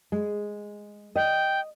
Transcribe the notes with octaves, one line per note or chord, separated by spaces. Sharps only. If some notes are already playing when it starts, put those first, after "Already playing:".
G#3
D#5 G5